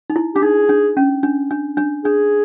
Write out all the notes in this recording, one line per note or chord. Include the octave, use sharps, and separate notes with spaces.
D#4
E4
D4 G4
D#4 G#4
D4
C#4
D4
D4
D4
D4 G#4